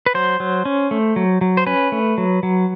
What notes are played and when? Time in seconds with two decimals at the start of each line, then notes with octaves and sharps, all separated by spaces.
0.06 B4
0.14 F#3 C5
0.40 F#3
0.65 C#4
0.91 A3
1.16 F#3
1.41 F#3
1.57 C5
1.67 C#4 B4
1.92 A3
2.18 F#3
2.43 F#3